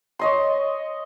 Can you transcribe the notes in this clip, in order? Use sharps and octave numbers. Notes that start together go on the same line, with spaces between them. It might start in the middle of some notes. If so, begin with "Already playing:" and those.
C#5 D#5 C6